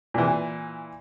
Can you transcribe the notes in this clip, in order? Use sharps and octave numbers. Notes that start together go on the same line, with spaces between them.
A#2 E3